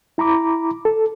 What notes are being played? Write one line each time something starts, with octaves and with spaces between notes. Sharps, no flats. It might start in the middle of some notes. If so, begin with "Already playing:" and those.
E4 A#5 B5 D6
A4